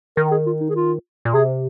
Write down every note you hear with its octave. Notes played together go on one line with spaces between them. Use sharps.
D#3 A#4
G#4
F4
D#4
G#4
F4
A#2
C3 G#4